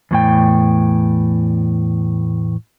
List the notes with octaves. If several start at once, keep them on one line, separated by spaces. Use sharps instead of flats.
E2 A2 G5